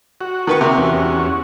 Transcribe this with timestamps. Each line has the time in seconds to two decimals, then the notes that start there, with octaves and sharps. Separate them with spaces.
0.21 F#4
0.47 D#3 B4 C#6
0.61 C3
0.78 E2 C#4 F#4